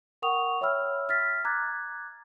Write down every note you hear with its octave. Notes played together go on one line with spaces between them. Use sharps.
A#4 F#5 G5 C#6 D#6 F7
C#5 E5 G5 B5 E6 F6
E5 F6 A6 B6
A#5 D6 F#6 G#6 A6